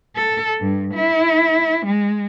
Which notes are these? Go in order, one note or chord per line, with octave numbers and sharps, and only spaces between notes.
A4
G2
E4
G#3